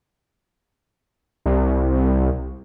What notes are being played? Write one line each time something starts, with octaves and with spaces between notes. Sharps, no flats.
C2